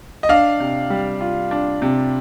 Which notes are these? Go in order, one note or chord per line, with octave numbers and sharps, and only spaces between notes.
D#5
D4 F5
C3
G3
F4
D4
C3